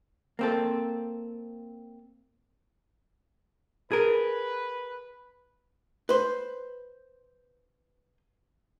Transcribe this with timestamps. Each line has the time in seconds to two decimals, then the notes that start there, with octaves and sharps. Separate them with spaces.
0.39 A#3 C4 A4
3.92 G#4 A#4 B4
6.09 B4 C5